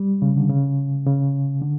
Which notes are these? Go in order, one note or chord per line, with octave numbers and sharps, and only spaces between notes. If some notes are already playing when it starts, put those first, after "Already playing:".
Already playing: G3
C#3
D3
C#3
C#3
D3